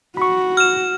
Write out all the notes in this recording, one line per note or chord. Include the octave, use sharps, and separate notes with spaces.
F#4 B5 C#6
F6 E7